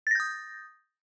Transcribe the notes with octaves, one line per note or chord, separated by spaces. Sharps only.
D#6 G6 A6 A#6